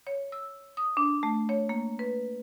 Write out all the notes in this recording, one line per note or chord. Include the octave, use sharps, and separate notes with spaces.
C#5
E6
D#6
D4
A3
C#5
A#3
B4